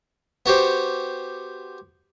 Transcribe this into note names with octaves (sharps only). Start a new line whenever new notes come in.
B3 F#4 G4 C5